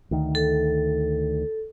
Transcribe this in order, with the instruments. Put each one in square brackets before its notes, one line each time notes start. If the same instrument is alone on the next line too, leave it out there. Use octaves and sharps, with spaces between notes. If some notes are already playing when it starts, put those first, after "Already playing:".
[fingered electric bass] D2 D#3
[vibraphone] A4